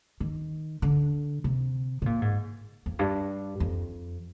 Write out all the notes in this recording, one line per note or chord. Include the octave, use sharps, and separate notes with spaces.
D#3
D3
C3
C3
A#2
G#2
F2
G2
F2